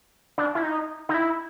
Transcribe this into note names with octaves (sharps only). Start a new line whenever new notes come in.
D4
E4
D#4
D#4
E4